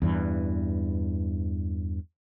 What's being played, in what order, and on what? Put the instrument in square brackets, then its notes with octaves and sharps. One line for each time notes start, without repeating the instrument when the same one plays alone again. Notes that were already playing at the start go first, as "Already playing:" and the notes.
[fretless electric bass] E2 G2 E3